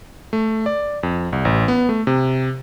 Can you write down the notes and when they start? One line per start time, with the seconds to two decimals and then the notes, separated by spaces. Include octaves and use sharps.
0.33 A3
0.66 D5
1.03 F2
1.33 C2
1.45 A1
1.68 B3
1.89 A3
2.07 C3